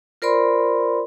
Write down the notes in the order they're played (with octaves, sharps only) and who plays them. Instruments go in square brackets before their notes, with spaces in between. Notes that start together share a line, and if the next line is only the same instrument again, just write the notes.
[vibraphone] F4 A#4 C5 D5 B5 C6